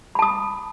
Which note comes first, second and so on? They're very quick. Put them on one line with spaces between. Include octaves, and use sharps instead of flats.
B5 A5 D#6